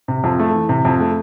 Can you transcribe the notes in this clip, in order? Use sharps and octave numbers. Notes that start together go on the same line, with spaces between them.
C3
F2
A3
E3
C3
F2
A3